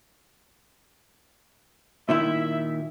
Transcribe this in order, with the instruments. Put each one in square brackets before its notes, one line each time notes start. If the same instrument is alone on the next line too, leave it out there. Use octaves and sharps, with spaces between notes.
[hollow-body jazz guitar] A#2 D#3 E4 [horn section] E5